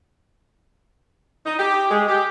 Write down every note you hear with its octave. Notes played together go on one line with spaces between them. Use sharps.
D#4
G4
G#3
G4